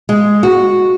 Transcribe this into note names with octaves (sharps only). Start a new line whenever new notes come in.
G#3
F#4